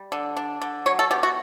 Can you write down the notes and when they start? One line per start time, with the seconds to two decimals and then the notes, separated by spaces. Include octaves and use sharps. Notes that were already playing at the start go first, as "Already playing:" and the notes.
Already playing: G3
0.12 D3
0.37 D4
0.62 D3
0.86 F#3 C#5
0.99 A4
1.11 B2 G4
1.23 F#4